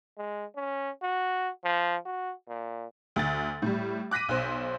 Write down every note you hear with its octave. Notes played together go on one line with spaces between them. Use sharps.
G#3
C#4
F#4
F3
F#4
A#2
D2 A6
A2 G3
D6 F#6 A#6 B6 D#7
B1 C5